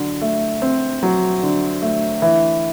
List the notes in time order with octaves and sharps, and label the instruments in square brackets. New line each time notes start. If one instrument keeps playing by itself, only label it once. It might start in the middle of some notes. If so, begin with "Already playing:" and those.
Already playing: [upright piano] D3 F#3
A3
C4
F#3
D3
A3
E3